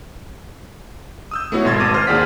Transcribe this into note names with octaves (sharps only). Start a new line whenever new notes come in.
D#6 E6 G6
A3 B3 E4 F#4 C#5
G#1 B2 C6 G#6 A6
G#1 A5 D6 D#7
C5 C6 F6
D#2 F4 G#4 D5 F#5 B6